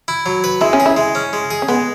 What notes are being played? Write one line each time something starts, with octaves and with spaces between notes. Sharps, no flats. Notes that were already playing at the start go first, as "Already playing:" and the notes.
E4
F#3
B4
G#3 E4
C#4
G#4
E4
G#3
C#4
G#3
G#4
C#4
G#3 B3